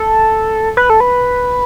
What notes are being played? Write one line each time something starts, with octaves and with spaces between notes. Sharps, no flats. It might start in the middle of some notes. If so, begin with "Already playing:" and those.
Already playing: A4
B4
A4
B4